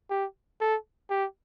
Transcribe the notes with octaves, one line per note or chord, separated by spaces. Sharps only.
G4
A4
G4